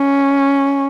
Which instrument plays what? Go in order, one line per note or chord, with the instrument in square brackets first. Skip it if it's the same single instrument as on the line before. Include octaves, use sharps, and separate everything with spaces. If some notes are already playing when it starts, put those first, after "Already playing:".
Already playing: [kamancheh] C#4